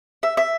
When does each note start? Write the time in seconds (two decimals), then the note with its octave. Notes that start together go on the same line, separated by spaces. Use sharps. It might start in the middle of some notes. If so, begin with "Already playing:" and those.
0.23 E5
0.37 E5